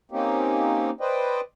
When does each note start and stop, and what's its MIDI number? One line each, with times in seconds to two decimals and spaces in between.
0.11 0.90 58
0.11 0.90 60
0.11 0.90 61
0.11 0.90 63
0.11 0.90 67
1.01 1.40 71
1.01 1.40 72
1.01 1.40 74
1.01 1.40 75
1.01 1.40 79